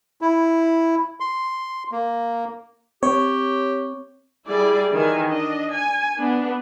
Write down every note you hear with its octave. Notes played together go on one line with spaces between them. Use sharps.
E4
C6
A#3
C4 G4 C#5
G3 E4 G#4 D5
D#3 E3 G#5
D4 D#5
G#5
B3 D4